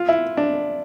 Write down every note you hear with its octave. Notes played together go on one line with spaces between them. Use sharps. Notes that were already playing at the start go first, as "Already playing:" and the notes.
Already playing: F4
E4
D4